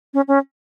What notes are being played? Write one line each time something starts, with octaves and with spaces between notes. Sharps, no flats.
C#4
C#4